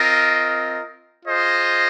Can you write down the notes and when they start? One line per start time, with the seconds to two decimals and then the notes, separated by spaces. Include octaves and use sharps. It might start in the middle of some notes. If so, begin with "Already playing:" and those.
Already playing: C4 F4 A#4 D#5
1.26 F4 G#4 C5 D#5